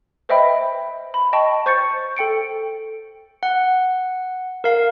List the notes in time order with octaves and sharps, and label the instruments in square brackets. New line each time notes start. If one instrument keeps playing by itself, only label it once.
[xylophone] B4 C5 D#5 E5 G5 B5
B5
D#5 G5 A5 C#6
C5 C#6 G6 A6 C#7
A4 G5 C#7 D7
[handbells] F#5
A#4 F5